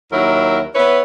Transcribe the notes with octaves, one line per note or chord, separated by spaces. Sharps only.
D#2 F#3 E4 A#4
B3 E4 B4 C#5